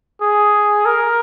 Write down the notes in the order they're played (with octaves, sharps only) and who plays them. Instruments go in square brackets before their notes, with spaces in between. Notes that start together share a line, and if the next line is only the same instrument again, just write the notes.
[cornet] G#4
A#4